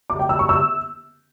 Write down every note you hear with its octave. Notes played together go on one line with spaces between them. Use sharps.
D6
G5
E6
C#6
E6